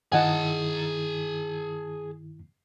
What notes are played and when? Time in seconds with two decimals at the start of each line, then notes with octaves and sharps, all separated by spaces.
0.12 G2 D#3 E4 G#4 D#5 F#5 G#5 A5